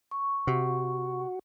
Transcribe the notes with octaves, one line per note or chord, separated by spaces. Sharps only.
C#6
C3 F#4